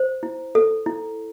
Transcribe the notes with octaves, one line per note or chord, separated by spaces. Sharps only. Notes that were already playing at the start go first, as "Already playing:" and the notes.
Already playing: C5
E4
A4
E4